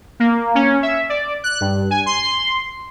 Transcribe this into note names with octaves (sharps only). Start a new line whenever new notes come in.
A#3
C#4
E5
D5
F#6
G2
G#5
C6